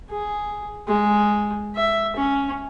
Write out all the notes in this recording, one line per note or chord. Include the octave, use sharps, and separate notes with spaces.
G#4
G#3
E5
C#4